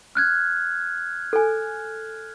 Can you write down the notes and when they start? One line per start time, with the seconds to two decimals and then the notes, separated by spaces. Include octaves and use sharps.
0.15 F6 F#6 G#6
1.33 A4 G#5